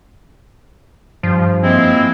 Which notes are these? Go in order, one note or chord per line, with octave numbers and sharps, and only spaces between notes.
G2 F3
G#3 A#3 C4 E4